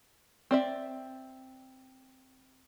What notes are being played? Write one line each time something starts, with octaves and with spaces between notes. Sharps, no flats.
C4 D5 E5